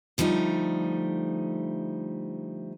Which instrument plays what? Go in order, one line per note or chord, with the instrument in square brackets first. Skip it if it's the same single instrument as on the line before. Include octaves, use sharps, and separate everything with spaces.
[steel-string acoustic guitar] D3 F3 G3 A3 D#4